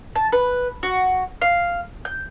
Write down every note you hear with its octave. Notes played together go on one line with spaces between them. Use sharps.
A5
B4
F#4
F5
G6